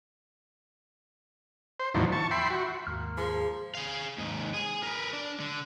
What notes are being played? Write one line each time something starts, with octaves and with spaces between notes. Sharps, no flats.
C5
E2 A2 D3 D#3 F3 F#3
A5 C#6
E5 G5 B5 C6
F#4
D#2 G#2 A#3 C6 F6
F3 G#4
G#4 F5
D#2 G#2
G#4 G#5
A#4 B4
D4
D3